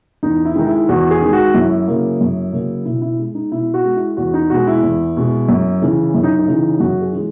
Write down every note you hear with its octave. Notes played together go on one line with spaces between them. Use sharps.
E2 D#4
E4
D#3 G#3 D#4
E4
E2 F#4
G#4
D#3 G#3
F#4
F#2 E4
C#3 F#3 A#3
F#2
C#3 F#3 A#3
B2 E4
E4
G#3
D#4
B2 E4
F#4
G#3
E4
E2 F#4
D#4
B2 G#3 F#4
E4
E2
B2 G#3
F#2
C#3 E3
F#2 E4
D#4
D#4
C#3 E3
F#2 F#4
G#4
E3 G#3